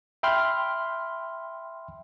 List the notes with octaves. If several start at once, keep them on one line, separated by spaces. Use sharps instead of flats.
E5 G5 B5 C6 F6